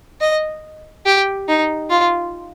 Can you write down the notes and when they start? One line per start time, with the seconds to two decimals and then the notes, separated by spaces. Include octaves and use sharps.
0.21 D#5
1.06 G4
1.48 D#4
1.90 F4